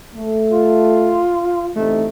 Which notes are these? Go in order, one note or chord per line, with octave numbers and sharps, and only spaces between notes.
A3
F4
A1 C3 A3 D#4